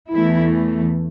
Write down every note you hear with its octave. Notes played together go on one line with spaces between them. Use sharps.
E2 E3 A3 E4